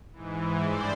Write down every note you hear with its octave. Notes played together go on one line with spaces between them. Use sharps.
G#2 E3
G2 C5 D5